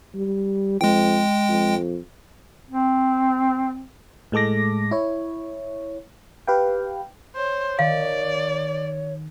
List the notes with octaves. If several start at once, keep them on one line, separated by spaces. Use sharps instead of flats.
G3
F2 G#3 G5
F2
C4
A2 G#3 A4 D6 A#6
E4 C#5
G4 B4 F5 G5
C5 C#5
D#3 D5 F5